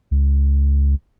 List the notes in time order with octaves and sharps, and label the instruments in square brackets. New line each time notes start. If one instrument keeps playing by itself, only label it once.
[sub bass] C#2